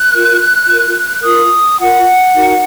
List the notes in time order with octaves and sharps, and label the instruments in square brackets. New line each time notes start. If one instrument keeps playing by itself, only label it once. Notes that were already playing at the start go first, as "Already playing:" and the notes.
Already playing: [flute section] F#6
F4 A#4
F4 A#4
F4 A#4 D#6
F4 A#4 F#5
D#4 F#4 A#4